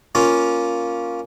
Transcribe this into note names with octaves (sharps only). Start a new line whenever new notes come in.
A#3 C#4 F4